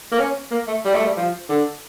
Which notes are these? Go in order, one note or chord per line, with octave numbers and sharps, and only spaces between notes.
A#3
C#4
A#3
A3
G3
A3
G3
F3
D3